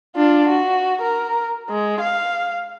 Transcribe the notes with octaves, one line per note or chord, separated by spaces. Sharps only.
D4 F4
F#4
A#4
G#3
F5